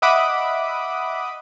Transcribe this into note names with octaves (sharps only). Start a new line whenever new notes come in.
D#5 E5 F#5 B5 D6 D#6